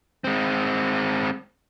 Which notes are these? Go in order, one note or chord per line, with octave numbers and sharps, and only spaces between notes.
G#3 C4